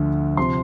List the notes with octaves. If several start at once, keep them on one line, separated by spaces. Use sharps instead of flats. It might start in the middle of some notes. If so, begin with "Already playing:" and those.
Already playing: D2 D3 F3
C3 F3 C6